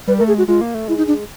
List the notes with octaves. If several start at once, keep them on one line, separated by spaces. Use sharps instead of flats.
G3 B4
A#4
A3
G#4
G#3 F#4
G#3 F4
A#3
A3
G#3 E4
D#4
D4